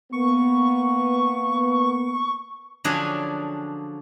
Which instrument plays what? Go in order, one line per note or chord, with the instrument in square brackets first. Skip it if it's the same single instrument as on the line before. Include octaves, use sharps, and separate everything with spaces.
[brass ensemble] A#3 B3 [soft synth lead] C#6
[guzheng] D3 F3 F#3 C#4 D4 G#4